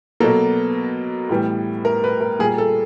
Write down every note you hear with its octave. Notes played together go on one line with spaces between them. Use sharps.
B2 F#3 A#3 A4
A2 E3 G3 B3
A#4
B4
A#4
A#2 G3 A#3 G#4
A4